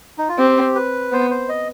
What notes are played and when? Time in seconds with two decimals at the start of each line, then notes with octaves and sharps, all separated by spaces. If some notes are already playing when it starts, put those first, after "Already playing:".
0.18 D#4
0.29 F4
0.39 C4 G4
0.75 B4
1.12 B3 C5
1.31 C5
1.49 D#5